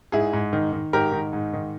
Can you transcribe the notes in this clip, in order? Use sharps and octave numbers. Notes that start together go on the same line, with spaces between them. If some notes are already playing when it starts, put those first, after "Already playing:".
G#2 E4 G#4
G#2
D#3
D#3
G#2 G4 A#4
D#3
G#2
D#3